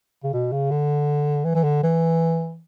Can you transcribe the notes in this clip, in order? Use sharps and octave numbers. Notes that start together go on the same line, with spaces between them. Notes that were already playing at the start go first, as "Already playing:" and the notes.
C#3
B2
C#3
D3
E3
E3
D3
E3